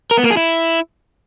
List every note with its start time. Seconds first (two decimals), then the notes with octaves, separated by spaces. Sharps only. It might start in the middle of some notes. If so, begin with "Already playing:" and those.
0.11 A#4
0.18 B3
0.24 A#3
0.30 G#4
0.37 E4